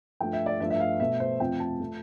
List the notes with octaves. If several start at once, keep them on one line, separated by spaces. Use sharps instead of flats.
G2 F3 A3 G5
E5
D5
G2 F3 A3 E5
E5
F5
B2 A3 E5
C5
F2 C3 F3 A3 G5
A5
F3 A3